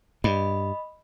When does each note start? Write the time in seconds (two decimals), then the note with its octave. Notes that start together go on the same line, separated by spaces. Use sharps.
0.24 G2 D#5 B5